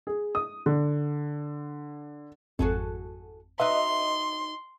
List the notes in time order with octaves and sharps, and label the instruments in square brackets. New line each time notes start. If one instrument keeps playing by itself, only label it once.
[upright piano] G#4
D#6
D3
[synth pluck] G#1 F2 [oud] F#4 G#4 A4
[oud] D#4 F#4 B4 [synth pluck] D#5 E5 [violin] C6